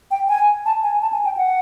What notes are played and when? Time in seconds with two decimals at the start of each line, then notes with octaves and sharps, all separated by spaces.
0.11 G5
0.29 G#5
0.66 A5
0.83 G#5
1.02 A5
1.13 G#5
1.25 G5
1.37 F#5